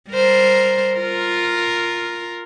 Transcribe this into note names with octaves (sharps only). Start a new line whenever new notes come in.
G3 A#4 C5
F4 A#4